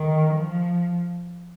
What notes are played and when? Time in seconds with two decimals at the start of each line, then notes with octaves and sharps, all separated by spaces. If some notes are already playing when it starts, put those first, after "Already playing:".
Already playing: D#3
0.34 F3